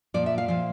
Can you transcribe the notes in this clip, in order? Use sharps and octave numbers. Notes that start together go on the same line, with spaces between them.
A#2 F3 D5
E5
F5
A#2 F3 F5